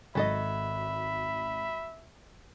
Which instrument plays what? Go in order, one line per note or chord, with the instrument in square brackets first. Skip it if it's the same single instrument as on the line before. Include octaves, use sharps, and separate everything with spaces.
[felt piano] G#1 [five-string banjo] F#3 A4 D#5 [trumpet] E5 [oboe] B5